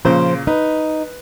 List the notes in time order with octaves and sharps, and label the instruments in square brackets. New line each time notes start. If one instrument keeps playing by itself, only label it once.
[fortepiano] A#2 C#3 [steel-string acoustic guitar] F3 C5
[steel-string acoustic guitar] D#4 [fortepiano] B4